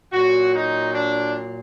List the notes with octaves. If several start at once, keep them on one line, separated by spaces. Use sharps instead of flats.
A#2 F#3 F#4
D#4
D4